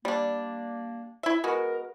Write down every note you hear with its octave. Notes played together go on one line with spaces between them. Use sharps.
G3 A#3 D4
E4 E5
G#3 B3 F#4 A#4